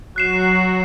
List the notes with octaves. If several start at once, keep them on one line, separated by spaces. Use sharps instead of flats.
F#3 F#4 F#6 C7 E7